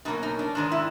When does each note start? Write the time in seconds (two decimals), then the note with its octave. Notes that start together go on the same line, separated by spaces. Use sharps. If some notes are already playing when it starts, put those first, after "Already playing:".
0.05 B2 F#3 A#3 C#4 D#4
0.23 D#4
0.39 D4
0.55 G#2 D#3 G#3 D4
0.72 E4